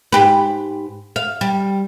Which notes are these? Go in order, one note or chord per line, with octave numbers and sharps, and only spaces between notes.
G#2 G4 B4
F5
G3